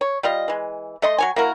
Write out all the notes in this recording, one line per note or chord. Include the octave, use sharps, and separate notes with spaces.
C#5
G3 F4 D#5
E3 G#3
A3 D#5 C6
F#3 C#5 G#5
A#3 E4 F#4 A#4